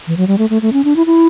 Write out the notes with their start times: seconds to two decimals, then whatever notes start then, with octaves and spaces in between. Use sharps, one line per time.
0.07 E3
0.17 F#3
0.27 G3
0.38 A3
0.50 A3
0.62 A3
0.73 C#4
0.84 D4
0.96 E4
1.06 E4